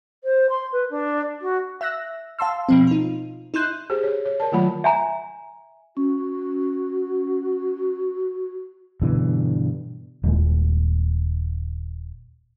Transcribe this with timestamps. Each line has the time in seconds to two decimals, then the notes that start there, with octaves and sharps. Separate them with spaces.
0.24 C5
0.50 C6
0.72 B4
0.90 D4
1.42 F#4
1.81 E5 E6 F#6 A#6
2.39 F5 A5 C6 E6
2.69 B2 F3 C4
2.87 D#4 F4
3.54 D#4 E4 C6 F#6 G6
3.90 G4 G#4 C5
4.03 C#5
4.25 C#5
4.40 A#4 D5 A5
4.52 D#3 F#3 A3 F4 F#5 B5
4.84 E5 G#5 A#5
5.97 C#4 F#4
9.02 G2 B2 D3 E3
10.23 D#1 D#2 G#3